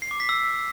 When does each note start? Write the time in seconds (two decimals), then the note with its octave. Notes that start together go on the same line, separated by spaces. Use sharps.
0.02 C7
0.11 D6
0.20 B6
0.29 E6